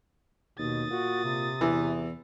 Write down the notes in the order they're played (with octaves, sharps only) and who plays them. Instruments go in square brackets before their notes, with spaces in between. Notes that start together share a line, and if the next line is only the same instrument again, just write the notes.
[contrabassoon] D#2 [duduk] B2 [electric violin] D#6 A6
[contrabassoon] A#2 [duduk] F#4
[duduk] C3
[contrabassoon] E2 [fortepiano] E3